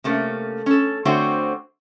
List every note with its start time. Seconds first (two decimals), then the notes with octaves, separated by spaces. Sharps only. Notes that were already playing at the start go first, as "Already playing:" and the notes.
0.04 C3 A3 A#3 C#4
0.66 C#4 A4
1.05 D3 A3 C4 F#4 C5 C#5